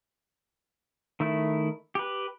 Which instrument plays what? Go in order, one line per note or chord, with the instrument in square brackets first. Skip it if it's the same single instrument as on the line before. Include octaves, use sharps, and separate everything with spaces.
[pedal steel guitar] D#3 A3 E4
G4 B4